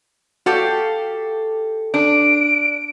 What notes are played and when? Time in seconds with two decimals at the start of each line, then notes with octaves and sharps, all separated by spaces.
0.46 F#4 G4 A4 F5
1.94 D4 D7